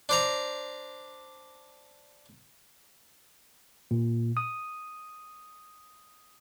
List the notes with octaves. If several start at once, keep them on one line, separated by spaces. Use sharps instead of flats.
D4 C5 A#5
A#2
D#6